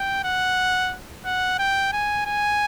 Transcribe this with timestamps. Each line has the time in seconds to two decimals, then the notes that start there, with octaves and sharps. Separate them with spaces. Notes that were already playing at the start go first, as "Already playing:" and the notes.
Already playing: G5
0.24 F#5
1.25 F#5
1.59 G5
1.93 G#5
2.26 G#5